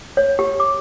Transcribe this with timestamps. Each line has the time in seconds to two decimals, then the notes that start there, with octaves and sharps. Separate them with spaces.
0.17 C#5
0.39 G4
0.60 D6